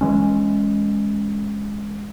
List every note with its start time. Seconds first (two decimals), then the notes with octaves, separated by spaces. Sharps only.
0.01 E3 G#3 C#4